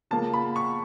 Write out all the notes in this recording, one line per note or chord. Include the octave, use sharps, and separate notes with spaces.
C#3 F3 A#3 A5
B5
C#6